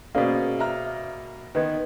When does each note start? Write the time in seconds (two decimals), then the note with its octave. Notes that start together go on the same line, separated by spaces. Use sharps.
0.15 B2 A#3 C#4 G#4 C5 D5 F5
0.59 E5 A#5 F6
1.55 D#3 B3 B4 D#5 G#6